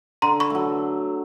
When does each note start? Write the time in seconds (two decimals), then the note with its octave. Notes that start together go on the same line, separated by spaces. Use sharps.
0.22 D3 A#5 C6
0.40 B5 C#6
0.50 F#3 A3